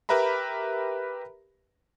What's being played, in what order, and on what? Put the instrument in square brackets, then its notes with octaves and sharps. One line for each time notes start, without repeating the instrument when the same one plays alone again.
[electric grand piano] G4 A#4 B4 E5 A#5 B5